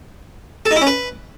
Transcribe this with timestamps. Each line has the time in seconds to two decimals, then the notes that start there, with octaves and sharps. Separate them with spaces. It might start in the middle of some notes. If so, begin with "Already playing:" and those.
0.66 A4
0.71 D#4
0.76 E4
0.81 C#4
0.87 B4